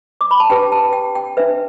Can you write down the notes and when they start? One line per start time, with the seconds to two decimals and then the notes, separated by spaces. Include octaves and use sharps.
0.21 D6
0.31 B5
0.40 A5
0.50 D4 G4 B4 G5
0.72 A5
0.93 G5
1.15 G5
1.37 D4 B4 E5